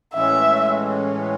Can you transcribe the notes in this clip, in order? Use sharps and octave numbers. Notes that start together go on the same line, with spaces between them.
A2 E3 G#3 C#4 E5